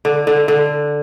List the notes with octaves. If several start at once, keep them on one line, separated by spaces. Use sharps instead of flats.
D3
D3
D3